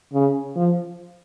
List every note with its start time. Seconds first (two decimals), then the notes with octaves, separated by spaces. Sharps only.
0.14 C#3
0.56 F3